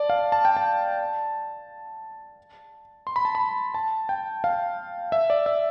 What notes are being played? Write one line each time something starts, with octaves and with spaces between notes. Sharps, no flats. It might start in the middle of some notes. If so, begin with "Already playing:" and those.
Already playing: D5 A5
F5
A5
G5
A5
C6
B5
A5
B5
A5
G5
F5
E5
D5
E5